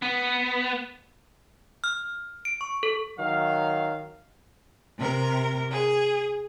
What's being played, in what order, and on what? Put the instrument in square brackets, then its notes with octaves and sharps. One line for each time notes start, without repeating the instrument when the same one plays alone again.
[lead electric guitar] B3
[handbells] F6
D7
C#6
A4
[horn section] D#3 F#3 F5
[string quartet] C3 A#4
G#4